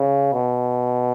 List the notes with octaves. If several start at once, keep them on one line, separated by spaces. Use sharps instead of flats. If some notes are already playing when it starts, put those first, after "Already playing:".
Already playing: C#3
B2